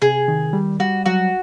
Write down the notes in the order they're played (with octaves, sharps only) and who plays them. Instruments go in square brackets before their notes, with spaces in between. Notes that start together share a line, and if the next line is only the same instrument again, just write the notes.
[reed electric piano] C3 [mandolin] G#4
[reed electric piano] D#3
G3
[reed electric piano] G3 [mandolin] F#4
[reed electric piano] F#3 [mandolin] F#4